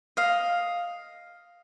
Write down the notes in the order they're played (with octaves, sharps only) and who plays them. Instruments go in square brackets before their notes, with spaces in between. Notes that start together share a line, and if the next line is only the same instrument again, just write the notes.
[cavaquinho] D#5 F5